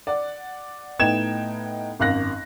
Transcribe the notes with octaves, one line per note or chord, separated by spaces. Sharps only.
D5 F#5
A2 B3 D#4 G5 G#6 E7
G#1 F#2 F5 F#6 A#6